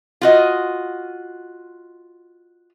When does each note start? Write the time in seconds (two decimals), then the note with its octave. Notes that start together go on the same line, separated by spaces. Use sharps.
0.21 F4 F#4 D#5